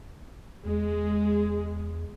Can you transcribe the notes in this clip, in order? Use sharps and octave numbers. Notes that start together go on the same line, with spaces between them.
E2 G#3